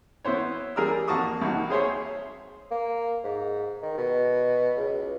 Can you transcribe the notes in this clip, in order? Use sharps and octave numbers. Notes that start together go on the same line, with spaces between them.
B3 E4 C5 C#5
G3 G#4 A#4 D5 E6
F2 A#3 F#4 A5 C#6 D#6
C2 A#3 D#4 F#4
G#4 C5 C#5 E5
A#3
G#2
D#3
B2
C#2